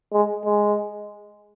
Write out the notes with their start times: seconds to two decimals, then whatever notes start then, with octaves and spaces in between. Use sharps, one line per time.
0.13 G#3
0.45 G#3